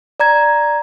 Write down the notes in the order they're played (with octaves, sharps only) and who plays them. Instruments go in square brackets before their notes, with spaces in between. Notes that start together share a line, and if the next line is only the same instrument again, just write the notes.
[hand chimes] D5 A#5 G#6